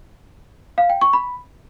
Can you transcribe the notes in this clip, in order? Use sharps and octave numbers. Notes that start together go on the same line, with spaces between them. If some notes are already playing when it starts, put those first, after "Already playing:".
F5
G5
C#6
B5